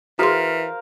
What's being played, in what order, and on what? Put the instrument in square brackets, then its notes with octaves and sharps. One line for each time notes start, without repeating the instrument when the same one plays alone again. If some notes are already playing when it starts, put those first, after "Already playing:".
[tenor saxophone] E3 [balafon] F#4 G#4 C6 [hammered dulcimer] A#4 C5 F5